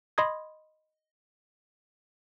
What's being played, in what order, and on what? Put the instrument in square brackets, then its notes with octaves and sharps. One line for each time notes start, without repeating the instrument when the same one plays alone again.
[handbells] D#5 B5 C6 D#6 G#6